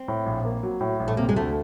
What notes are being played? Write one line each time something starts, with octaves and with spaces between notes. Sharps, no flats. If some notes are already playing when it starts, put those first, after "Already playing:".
Already playing: C4
A2
A#1
A#3
F#3
A2
A#1
A3
C3 A#3
G#3
D2 A3